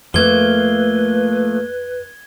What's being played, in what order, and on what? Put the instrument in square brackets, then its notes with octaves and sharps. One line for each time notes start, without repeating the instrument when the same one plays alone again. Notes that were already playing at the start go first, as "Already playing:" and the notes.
[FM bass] F2 [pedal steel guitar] F3 A3 A#3 [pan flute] B4 [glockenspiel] G#6 G7